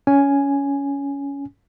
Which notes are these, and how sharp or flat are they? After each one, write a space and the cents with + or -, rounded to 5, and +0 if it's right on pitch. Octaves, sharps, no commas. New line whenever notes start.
C#4 +20 G#5 +0